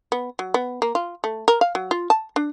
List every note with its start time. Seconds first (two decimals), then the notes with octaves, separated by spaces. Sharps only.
0.12 B3
0.39 F#3
0.54 B3
0.82 A#3
0.95 F4
1.24 A3
1.48 A#4
1.61 F5
1.75 F#3
1.91 F4
2.10 A5
2.36 D4